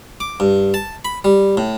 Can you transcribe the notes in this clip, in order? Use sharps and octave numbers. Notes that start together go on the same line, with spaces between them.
D6
G2
A5
B5
G3
A2